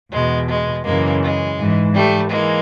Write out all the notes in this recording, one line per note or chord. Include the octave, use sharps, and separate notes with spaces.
E2 B2 G#3
G#3
F#2 C#3 E3 G#3 A#3
G#3
G#2 E3
G3 A3
E3 G#3 A#3